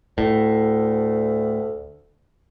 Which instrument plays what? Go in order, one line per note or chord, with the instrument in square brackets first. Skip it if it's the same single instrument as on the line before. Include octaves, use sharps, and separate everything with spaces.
[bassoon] D2 [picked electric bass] A2